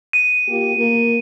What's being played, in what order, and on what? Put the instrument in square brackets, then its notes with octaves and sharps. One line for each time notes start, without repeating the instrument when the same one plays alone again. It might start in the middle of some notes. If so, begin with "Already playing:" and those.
[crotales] D#7
[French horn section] A#3 F4 G4
A#3 A#4